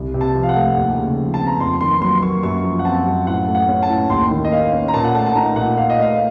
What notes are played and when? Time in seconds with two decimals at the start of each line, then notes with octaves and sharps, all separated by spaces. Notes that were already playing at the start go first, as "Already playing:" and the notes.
Already playing: C2
0.14 C3
0.21 A5
0.35 F3
0.43 F5
0.49 F#5
0.56 A3
0.76 D#2
0.98 C#3
1.18 F3
1.34 C4 A5
1.47 A#5
1.60 F2 C6
1.81 D#3 C6
2.02 F#3 C6
2.23 A#3 C#6
2.43 F#2 C#6
2.64 F3
2.79 F#5
2.85 C4 A5
3.06 F#2
3.27 A2 F#5
3.48 A3
3.55 F#5
3.69 C#4
3.83 A5
3.90 A2
4.10 D#2 C6
4.31 D#3
4.45 D#5
4.52 A#3 F5
4.73 C#4
4.88 A#5
4.94 A#2 A5
5.04 F#5
5.14 A3 A5
5.26 A5
5.36 D#4 A#5
5.56 A#2 F#5
5.77 A#2 F5
5.90 D#5
5.98 A3 F5